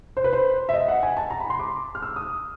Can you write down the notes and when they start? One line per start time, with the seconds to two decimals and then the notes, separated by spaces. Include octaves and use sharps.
0.17 C5
0.24 B4
0.33 C5
0.69 E5
0.73 D#5
0.88 F#5
1.03 G#5
1.17 A5
1.30 A#5
1.40 B5
1.50 C6
1.59 D6
1.95 F6
2.02 E6
2.16 D#6